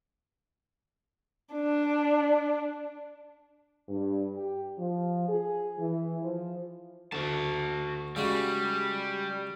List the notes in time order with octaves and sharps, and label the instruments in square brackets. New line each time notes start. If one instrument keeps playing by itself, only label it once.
[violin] D4
[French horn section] G2
G4
F3
G#4
E3
F3
[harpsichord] D2 [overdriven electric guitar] F#4 A5
[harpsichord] C#3 G#3 F#4 [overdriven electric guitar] G3